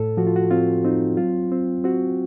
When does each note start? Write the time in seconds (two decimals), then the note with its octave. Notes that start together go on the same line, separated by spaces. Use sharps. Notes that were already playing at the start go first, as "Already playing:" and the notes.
Already playing: A2 A4
0.17 F3 F#4
0.27 F4
0.36 F#4
0.51 C4 F4
0.84 C4 D#4
1.17 F#3 F4
1.52 C4
1.84 C4 F#4